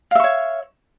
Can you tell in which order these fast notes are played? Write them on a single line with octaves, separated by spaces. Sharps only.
F5 E5 C#6 C#5